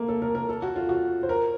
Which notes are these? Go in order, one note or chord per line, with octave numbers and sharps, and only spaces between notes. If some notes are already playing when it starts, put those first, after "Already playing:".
Already playing: A3 A#3
A4
A#4
A#4
A4
F#4
F4
F#4
C5
A#4